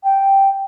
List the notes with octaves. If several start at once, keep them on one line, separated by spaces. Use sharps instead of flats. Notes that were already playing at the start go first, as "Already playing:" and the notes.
G5